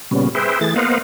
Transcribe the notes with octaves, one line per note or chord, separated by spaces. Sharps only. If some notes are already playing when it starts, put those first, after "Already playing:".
A#2 C#3 G3 B3 C#4
G#4 B4 C5 E5 G5
E3 A3 G#4 A6
A#3 B3 C5 D#5 F5 F#5